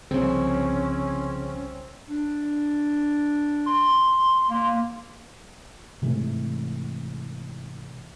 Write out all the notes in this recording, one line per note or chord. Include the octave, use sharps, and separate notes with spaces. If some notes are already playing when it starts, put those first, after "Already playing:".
C2 C#3 F3 C4 C#4
D4
C6
A#3
G#2 C3 E3 A3